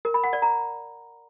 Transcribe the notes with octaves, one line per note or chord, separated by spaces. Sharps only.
A#4
B5
F#5
D5
A#5